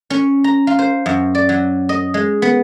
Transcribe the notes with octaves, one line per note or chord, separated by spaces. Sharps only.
C#4
A#5
F4
C5
F#2
D5
F#3
D#5
G#3
B3